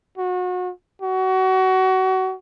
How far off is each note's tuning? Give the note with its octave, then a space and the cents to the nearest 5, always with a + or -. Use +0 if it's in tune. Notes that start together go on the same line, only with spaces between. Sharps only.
F#4 -30
F#4 +25